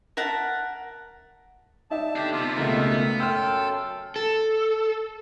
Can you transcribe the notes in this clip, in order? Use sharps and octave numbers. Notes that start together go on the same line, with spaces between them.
A#4 E5 F#5 A5
D#4 D5 E5 A5
D4 G4 A4
C3 B3 F4
C#2 B2 A3 A#3 D#4 E5
B3
F#2 A4 G5 C6 E6 F6
A4